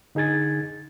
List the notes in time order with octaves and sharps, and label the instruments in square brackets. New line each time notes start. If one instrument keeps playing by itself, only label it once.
[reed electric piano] D3 D#4 G#4 G#6 A6